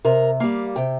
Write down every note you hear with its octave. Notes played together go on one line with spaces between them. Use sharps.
C3 A#4
G3 A#3 F5
C3 G5